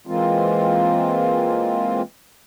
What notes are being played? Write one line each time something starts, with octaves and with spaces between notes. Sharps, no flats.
E3 G#3 A#3 C4 F4